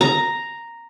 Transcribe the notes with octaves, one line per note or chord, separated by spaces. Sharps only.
A#5